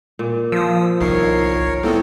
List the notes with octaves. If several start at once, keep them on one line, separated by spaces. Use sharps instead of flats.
A#2
F3 D#6 E6
G1 C2 D#3 A#4 C#5 C7
A2 G3 B3 C4 A4